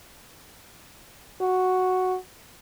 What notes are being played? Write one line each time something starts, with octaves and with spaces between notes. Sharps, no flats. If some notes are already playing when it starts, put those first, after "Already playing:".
F#4